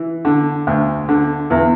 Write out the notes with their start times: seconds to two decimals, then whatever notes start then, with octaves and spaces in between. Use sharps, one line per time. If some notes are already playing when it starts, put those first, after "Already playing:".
Already playing: E3
0.25 D3
0.67 D2
1.09 D3
1.50 E2